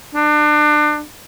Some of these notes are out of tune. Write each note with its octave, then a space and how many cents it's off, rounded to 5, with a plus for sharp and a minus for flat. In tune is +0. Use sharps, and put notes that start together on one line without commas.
D4 +30